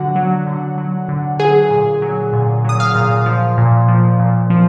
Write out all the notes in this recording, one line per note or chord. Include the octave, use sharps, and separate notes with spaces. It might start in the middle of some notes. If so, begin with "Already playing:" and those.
Already playing: D3 F#3 F#4 F#5
F#3
D3
F#3
D3
F#3 G#4 G#5
A#2
F#3
A#2
F#3 D#6
F5 F6
A#2
F3
A#2
F3
A#2
F3